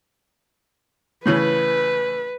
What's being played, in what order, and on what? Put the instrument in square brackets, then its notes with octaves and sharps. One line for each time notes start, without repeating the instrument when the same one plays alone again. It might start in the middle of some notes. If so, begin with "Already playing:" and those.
[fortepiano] A2 C#3 E3 [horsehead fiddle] B4